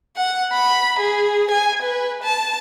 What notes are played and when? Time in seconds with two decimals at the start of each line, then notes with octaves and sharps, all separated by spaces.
0.16 F#5
0.53 B5
1.00 G#4
1.51 G#5
1.82 B4
2.24 A5